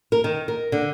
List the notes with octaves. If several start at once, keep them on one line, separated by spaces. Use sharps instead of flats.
A#4
D#3
A#4
D3